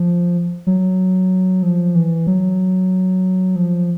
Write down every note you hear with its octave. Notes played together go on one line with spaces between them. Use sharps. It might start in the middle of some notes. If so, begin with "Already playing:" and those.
Already playing: F3
F#3
F3
E3
F#3
F3